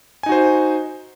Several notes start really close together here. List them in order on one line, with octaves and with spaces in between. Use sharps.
G#5 D#4 F#4 C5